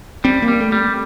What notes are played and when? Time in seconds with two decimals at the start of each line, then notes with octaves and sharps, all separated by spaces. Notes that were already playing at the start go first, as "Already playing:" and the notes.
0.24 G3 C4
0.42 A#3
0.48 G3
0.60 A3
0.72 G3